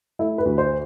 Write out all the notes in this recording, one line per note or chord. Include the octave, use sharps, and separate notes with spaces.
A3 E4
B4
D2
C5